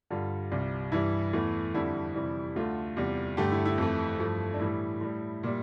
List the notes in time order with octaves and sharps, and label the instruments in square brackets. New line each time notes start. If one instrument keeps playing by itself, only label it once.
[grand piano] G2 D3 G3 F4
C2 C3 G3
G2 E3 G3 E4
E2 E3 A3
F2 D3 G3 E4
F2 C3 E3 G3
D2 D3 A3 F4
E2 C3 G3
G2 D3 A3 G4
E4
E4
F2 E3 A3
G2 F3 A3
D4
A2 E3 G3 E4
A2 G3
A#2 G3